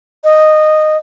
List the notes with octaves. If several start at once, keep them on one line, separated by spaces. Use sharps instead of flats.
D#5